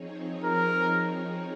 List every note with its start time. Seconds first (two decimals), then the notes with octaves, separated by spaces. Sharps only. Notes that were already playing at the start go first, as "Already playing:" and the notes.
Already playing: F3 C4 D#4 G#4 C#5
0.44 A#4